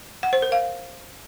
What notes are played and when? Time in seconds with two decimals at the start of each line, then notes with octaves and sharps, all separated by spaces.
0.23 F#5
0.33 C5
0.42 A#4
0.52 F5